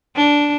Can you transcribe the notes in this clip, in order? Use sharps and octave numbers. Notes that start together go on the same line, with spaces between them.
D4